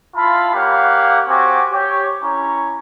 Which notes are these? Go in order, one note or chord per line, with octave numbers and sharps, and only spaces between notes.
E4 F4 F5 A5 B5
A#3 G4 C#5 F5 F#5
C4 F#4 G4 G#5 D6
G4 C#5
C#4 E4 C#5 A#5